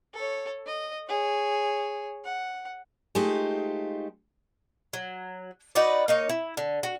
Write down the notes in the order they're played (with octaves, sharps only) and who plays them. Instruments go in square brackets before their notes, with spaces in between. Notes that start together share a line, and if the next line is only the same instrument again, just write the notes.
[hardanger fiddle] A4 C#5
D#5
G#4 C#5
F#5
[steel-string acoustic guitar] G#3 A3 D#4 F4 G4 C5
[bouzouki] F#3
D#4 F#4 B4 D5
A#3 D#4 C#5
E4
D3
F#4